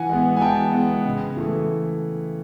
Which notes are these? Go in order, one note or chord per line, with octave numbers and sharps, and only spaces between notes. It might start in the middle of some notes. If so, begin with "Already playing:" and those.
Already playing: E3 F#5 G#5
G#3 B3
G#5
E3 G5 A5
G#3 B3
C#3
E3 A3